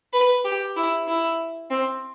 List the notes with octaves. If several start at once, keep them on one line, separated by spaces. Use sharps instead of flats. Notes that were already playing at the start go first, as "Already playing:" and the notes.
B4
G4
E4
E4
C4